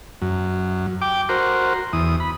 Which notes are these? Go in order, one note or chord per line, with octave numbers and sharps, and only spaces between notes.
F#2
G5 D6
F#4 A#4 C5
E2 D#6
B5